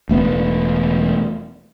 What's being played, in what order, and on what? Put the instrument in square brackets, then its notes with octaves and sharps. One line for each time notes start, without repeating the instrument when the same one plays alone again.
[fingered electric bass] E1 A3 B3